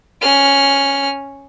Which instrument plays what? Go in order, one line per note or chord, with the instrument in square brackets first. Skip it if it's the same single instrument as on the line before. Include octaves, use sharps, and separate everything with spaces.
[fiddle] C#4 F6